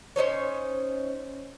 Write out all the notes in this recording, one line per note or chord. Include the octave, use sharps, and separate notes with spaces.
C#4 D#4 C5 C#5